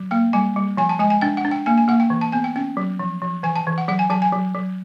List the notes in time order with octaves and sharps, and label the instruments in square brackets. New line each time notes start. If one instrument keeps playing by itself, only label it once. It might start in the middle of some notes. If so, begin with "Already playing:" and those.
Already playing: [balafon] F#3
A#3 G5
G3 G#5
G3
F3 G#5
A5
G#3 G#5
G#5
D4 G5
F#5
D4
G5
A#3 G#5
G#5
A#3 F#5
G5
E3
A5
B3 G#5
G5
C#4 G5
F#3
F3
F3
E3 G#5
A5
E3
F#5
F#3 F#5
G#5
F#3 A5
G#5
F#3
F#3